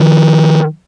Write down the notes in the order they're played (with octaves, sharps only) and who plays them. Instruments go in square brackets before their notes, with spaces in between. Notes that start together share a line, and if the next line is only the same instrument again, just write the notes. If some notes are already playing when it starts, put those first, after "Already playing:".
Already playing: [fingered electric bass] D#3 F3